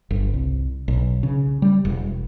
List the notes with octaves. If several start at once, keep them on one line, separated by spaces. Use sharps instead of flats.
G1
C2
B1
C#3
G3
E1